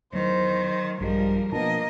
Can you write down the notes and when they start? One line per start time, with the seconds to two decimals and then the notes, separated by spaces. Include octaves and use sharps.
0.13 E2 D#3 F#3 C5
1.01 A#1 G2 F3 G3 G#3 G4 A#4 D#5
1.52 B2 F3 A#3 B3 D4 A#4 D#5 A5